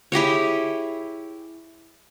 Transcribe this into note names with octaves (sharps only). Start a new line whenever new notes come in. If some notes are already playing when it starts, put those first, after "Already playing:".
E4 G4 G#4 C#5